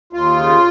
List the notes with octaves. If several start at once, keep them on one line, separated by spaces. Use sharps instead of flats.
D#2 F4
C#3